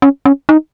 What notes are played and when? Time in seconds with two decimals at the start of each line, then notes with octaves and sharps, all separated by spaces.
0.02 C#4
0.25 C#4
0.49 D#4